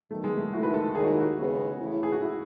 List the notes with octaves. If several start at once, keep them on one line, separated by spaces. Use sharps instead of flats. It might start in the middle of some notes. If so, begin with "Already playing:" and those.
D#3 F#3 A3 B3
G#3
A3
D#3 A3 E4 F#4
B4
A4
D#2 D#3 G#3 G#4
F#4
E4
F#4
D#2 C#3 G#3 B3
C#3 E3 A3 E4
G#4
F#4
E4